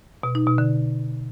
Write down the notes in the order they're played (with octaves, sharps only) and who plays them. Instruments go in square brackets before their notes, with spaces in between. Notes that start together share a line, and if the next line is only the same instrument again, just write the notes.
[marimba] B2
D#4
B2
D3